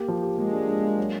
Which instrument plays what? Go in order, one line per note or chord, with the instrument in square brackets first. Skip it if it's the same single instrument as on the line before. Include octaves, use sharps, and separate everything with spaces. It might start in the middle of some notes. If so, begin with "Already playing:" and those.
Already playing: [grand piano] A#3 G4
F3
G4
[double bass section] G#3 [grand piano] A#3
[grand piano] D4
D4
A#3
F#3